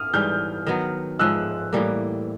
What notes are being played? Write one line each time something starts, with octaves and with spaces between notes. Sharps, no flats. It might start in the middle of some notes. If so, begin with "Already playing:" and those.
Already playing: B3 D#6 F6
G#2 E3 G3 F6 G6
D#3 F#3 B3
G#2 F3 G#3 E6 F#6
A2 E3 G3 A#3